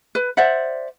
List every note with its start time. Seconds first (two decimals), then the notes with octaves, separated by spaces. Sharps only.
0.15 B4
0.37 C5 D5 E5 F#5